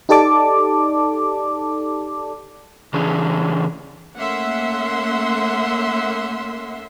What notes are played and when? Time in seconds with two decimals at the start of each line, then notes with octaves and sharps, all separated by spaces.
0.09 D#4 G4 A4 D5 A5 D6
2.93 C#3 E3 C#4 D4 G#4
4.16 A3 A#3 C#4 E5 F#5 C6